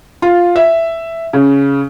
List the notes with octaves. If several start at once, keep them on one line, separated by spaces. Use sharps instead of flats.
F4
E5
C#3